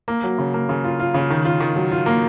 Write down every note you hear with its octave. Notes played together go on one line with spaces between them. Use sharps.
A#3
F#3
C#3
A#3
C#3
F4
F4
C#3
D#3
F4
D#3
F#3
F4
A#3